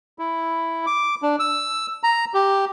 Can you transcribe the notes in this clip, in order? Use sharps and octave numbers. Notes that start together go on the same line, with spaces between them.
E4
D6
D4
E6
A#5
G4